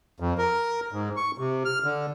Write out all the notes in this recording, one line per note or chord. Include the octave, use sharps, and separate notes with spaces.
F2
A#4
G#2
C#6
C3
F6
D3